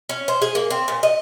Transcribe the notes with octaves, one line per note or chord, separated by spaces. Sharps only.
C#4
C5
G#4
A#3
C4
A#2
D#5